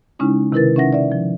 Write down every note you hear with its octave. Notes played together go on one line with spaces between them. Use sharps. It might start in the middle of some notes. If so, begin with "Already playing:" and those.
C#3 G#3 C#4 D#4 E4
C3 D#3 E4 A#4 B4 A6
C#4 D#4 E5 F#5 A#6
D5 E5
F3